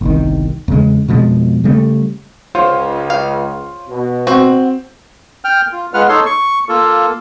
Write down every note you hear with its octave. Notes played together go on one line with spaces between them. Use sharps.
G1 C2 D#3
E2 C#3 G#3
F2 B2 F3 G#3
C#3 G3 A3
C#2 F4 C5 C#5
F5
B2
C4 F#4
G5 F6
F4
G#3 F4 B4 F#5 F6
D#4 A4 C#5 C6
C#6
A#3 F4 A4